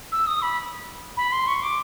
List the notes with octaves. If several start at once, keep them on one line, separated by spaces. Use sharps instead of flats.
E6
D#6
B5
B5
C6
C#6
D6